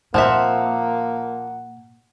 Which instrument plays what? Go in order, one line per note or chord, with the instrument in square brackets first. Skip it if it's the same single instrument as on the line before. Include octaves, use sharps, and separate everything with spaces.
[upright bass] A#2 [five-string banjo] F3 C4 E5 [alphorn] A#3 [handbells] F#5